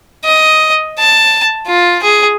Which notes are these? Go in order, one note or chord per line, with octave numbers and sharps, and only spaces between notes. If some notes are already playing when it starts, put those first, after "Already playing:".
D#5
A5
F4
G#4